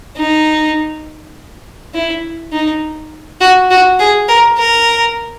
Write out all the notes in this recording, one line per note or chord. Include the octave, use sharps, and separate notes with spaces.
D#4
E4
D#4
F#4
F#4
G#4
A#4
A#4